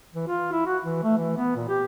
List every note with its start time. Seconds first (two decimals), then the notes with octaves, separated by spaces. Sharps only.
0.14 E3
0.28 F4
0.52 E4
0.66 F#4
0.84 E3
1.03 A3
1.17 E3
1.37 B3
1.56 A#2
1.69 G4